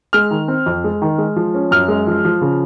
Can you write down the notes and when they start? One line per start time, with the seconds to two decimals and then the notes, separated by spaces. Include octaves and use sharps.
0.13 G#3 F6
0.31 D#3
0.48 C4
0.66 F2
0.84 G#3
1.02 D#3
1.18 G#3
1.36 F3
1.54 C#4
1.71 F#2 F6
1.88 G#3
2.07 F3
2.25 F3
2.42 C#3